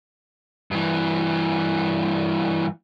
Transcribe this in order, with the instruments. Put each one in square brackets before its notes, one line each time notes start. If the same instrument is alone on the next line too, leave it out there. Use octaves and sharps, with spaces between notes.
[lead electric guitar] G2 E3